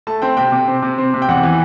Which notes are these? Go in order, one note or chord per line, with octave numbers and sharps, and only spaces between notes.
A3 A5
C4 G5
C3 G5
C3
C4
C3
C4
C3
G5
E2 F#5
E3